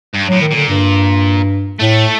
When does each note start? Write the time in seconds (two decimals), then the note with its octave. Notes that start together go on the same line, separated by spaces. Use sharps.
0.14 G2
0.28 A2 F#3
0.41 D#3
0.51 A#2 D3
0.69 G2
1.80 A2 A3